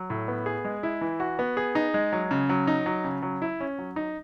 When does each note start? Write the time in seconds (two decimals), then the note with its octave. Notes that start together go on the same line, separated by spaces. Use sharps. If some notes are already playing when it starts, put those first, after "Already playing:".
Already playing: F#3
0.10 A2
0.28 B3
0.46 G#4
0.65 G#3
0.83 E4
1.01 E3
1.20 F#4
1.39 B3
1.57 G#4
1.75 D#4
1.94 G#3
2.12 F#3
2.31 C#3
2.49 F#3
2.67 D#4
2.86 F#3
3.04 C#3
3.22 F#3
3.42 E4
3.60 C#4
3.79 F#3
3.96 D#4